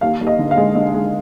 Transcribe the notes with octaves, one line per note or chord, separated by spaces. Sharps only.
D#2 F5
D#2
D#5
D3
F5
G#3
D3 D#5
G#3